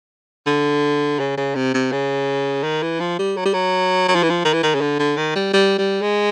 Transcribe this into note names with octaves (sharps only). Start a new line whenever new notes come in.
D3
C#3
C#3
C3
C3
C#3
D#3
E3
F3
G3
F#3
G3
F#3
F#3
F3
E3
F3
D#3
E3
D#3
C#3
D3
D3
D#3
G3
G3
G3
G#3